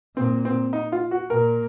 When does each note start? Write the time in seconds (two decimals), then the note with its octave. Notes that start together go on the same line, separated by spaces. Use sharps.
0.17 A#2 C4
0.45 C4
0.73 D#4
0.92 F4
1.11 F#4
1.30 A#2 A#4